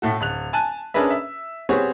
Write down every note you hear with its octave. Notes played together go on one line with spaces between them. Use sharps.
A2 A3 F#4
D1 F#6 F7
G#5 A5 F#6 D#7
C#4 D4 G#4 A#4 B4 E5
E5
G3 B3 C4 G#4 C#5